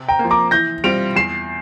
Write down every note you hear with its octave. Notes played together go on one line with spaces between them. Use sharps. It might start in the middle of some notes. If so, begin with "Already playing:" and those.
Already playing: C3
G5 A#5
A#3
F3
A#5 D6
E3 G6 A#6
G3 C4 F4 D7 F7
E2 C7 E7